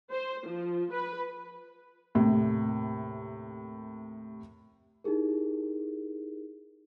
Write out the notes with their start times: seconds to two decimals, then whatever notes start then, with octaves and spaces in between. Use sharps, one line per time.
0.11 C5
0.46 F3
0.91 B4
2.15 D#2 A2 C3
5.04 D#4 E4 G4 G#4 A#4